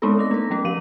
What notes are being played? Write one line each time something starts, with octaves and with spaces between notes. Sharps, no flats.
G#3 B3 C4 D4 D#4 A4
C#4 A#6
A3 A#4
F#3 A3 C#4
F3 F5 D#7